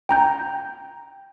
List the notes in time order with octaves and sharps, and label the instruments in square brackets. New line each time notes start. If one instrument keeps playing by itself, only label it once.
[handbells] G5 A#5 G6